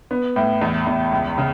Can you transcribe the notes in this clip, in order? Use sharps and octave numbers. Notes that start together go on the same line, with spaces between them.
B3
A2
E2
E2
C#2
C#3